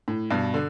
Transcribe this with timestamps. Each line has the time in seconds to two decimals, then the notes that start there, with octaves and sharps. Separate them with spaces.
0.08 A2
0.31 G2 B2
0.54 D3